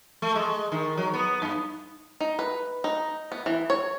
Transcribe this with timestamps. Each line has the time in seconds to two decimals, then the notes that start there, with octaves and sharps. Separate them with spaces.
0.22 A3
0.35 G#3
0.72 D#3
0.97 F#3
1.14 B3
1.42 G2
2.20 D#4
2.39 B4
2.84 D#4
3.32 B3
3.46 E3
3.70 C#5